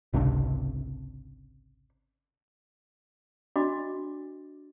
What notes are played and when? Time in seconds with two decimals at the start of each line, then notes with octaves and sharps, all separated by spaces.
0.13 G#1 C#2 C3 D4
3.56 D4 F#4 D5 D#5 B5 D6